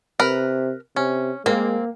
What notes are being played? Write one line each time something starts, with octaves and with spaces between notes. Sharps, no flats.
C3 A#4 B4
C3 C#4
G#3 A#3 C4